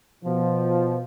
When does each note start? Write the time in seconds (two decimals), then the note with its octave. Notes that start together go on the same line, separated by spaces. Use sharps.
0.24 B2 F3